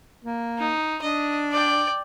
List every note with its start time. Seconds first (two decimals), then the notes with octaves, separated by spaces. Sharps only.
0.24 A#3
0.58 D#4
1.02 D4 D#5
1.51 D5 G5